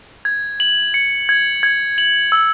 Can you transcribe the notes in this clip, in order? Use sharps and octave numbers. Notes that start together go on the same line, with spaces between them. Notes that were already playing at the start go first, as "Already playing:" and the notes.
G#6
F#7
C#7
G#6
G#6
F#7
E6